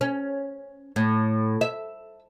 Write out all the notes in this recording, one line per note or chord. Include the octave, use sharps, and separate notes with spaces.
C#4
A2
E5